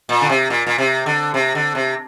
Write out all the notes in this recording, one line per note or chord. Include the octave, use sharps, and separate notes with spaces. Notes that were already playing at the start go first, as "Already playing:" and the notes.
A#2
D3
C3
A#2
A#2
C3
D3
C3
D3
C3